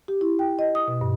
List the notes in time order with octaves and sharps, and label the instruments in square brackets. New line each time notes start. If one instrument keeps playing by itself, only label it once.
[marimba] G4
E4
G5
D#5
D#6
B2
G2